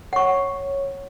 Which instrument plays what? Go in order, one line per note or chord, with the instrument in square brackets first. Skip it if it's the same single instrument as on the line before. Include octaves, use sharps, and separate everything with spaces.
[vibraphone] C#5 [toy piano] F#5 C#6